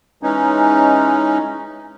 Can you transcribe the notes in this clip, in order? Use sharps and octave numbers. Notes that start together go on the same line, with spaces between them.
E3 G#3 C#4 D#4